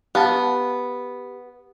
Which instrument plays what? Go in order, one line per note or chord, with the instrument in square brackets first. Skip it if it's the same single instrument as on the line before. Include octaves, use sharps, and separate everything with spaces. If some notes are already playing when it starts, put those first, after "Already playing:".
[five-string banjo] B3 [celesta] G4 [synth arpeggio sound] F5 A5